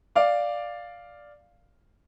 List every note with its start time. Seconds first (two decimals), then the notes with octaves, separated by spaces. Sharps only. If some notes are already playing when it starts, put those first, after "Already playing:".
0.15 D5 F5 D6